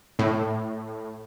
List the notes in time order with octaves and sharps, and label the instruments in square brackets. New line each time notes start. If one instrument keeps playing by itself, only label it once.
[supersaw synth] A2